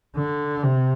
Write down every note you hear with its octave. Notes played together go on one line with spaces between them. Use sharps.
D3
C3